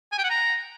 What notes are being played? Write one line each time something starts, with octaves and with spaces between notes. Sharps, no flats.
G#5
G5
F#5
A#5